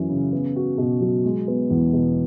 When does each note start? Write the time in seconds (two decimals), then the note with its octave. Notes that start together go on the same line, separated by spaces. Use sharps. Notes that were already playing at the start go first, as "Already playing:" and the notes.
Already playing: F#2 E3 C#4
0.09 C#3
0.33 B3
0.56 F#4
0.78 B2
1.01 F#3
1.25 G#3
1.48 B3
1.70 E2
1.93 B2